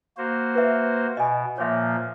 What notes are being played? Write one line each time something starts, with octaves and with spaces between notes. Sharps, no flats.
A#3 F#4 C5
B4 E5
B2 D#5 G#5
A#2 F3 A#3 C#5 E5